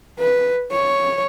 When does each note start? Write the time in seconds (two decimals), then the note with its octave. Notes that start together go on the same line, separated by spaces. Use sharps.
0.19 B4
0.72 C#5